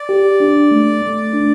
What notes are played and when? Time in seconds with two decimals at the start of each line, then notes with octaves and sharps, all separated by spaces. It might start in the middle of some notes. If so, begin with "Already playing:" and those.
Already playing: D5
0.09 G4
0.40 D4
0.71 A3
1.02 A3
1.33 D4